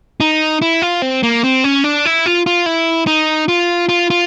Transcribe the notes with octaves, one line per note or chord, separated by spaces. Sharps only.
D#4
E4
F4
C4
A#3
C4
C#4
D4
E4
F4
F4
E4
D#4
F4
F4
F4